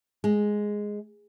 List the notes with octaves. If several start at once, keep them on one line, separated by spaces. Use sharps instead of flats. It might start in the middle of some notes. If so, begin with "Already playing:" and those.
G#3